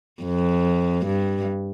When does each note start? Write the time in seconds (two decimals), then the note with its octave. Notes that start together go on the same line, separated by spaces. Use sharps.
0.22 F2
1.06 G2